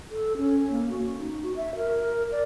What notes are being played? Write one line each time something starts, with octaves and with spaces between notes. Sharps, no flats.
A4
C#4
A#3
F#4
D#4
F#4
E5
A#4
D5